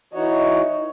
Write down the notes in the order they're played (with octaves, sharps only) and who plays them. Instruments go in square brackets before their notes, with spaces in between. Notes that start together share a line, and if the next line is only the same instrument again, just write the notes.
[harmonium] E3 F#4 C#5 [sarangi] D#4